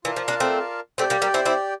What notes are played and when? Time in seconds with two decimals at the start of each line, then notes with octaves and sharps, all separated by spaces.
0.04 E3 F4 A#4 D5 F5 A5
0.16 F3
0.28 A#3 D4
0.40 A3 C4
0.98 A3 C4 G4 D5 G5
1.10 G3 A#3
1.22 G3 A#3
1.34 C4 E4
1.45 C4 E4